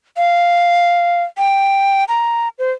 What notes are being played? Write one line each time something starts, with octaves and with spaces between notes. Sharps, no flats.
F5
G5
A#5
C5